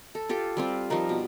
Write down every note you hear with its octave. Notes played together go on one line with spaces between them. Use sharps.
A4
F4 G4 A4
G3 C4 F4
F3 G3 D#4 A#4
B2